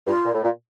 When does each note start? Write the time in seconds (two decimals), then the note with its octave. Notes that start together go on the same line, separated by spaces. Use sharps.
0.07 G2 F4
0.25 A#2
0.34 A2
0.43 A#2